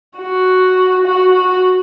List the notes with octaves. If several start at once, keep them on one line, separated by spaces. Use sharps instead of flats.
F#4
F#4
F#4